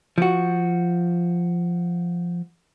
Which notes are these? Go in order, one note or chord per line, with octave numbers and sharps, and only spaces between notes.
F3 F#4